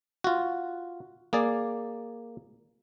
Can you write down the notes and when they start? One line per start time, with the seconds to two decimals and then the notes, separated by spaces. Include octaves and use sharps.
0.24 F4 F#4
1.33 A#3 G#4 D5